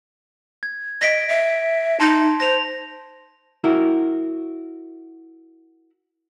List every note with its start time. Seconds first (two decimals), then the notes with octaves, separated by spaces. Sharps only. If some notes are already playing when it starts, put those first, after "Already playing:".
0.63 G#6
1.01 D#5 A#6 B6 D7
1.29 E5
2.00 D#4 A5 C6 A#6
2.40 C5 A#6 F7
3.64 E4 F#4 A#4